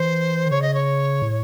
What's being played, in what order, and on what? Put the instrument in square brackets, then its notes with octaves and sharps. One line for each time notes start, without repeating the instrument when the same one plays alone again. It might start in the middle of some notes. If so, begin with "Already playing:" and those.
Already playing: [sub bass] E3 [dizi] C5
[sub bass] D#3
[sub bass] C#3 [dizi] C#5
[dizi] D#5
C#5
[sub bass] A2